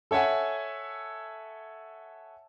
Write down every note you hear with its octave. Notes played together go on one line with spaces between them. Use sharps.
A4 C#5 E5 F#5 G#5